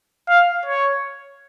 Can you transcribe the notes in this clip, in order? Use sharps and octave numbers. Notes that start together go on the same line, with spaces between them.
F5
C#5